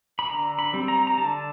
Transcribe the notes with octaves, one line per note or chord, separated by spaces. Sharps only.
B5
D3 A#5
B5
G3 C4
A#5
A#5
D3 A5